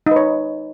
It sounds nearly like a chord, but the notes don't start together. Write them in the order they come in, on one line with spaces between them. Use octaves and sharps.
D#4 B4 C#5